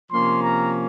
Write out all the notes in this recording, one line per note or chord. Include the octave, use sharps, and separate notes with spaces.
C3 F3 A#3 C#4 C6
A#5